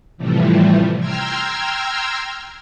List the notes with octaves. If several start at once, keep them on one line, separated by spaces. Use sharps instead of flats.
A2 C3 E3 F3 G3 A3
G5 A#5 C6 E6 F6 G#6